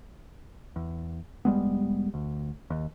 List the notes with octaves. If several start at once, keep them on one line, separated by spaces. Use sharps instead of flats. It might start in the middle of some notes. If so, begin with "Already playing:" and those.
E2
F1 G3 G#3 B3
D2
D#2